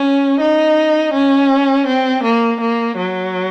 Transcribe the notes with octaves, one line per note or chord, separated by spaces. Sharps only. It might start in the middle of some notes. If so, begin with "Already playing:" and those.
Already playing: C#4
D#4
C#4
C4
A#3
A#3
F#3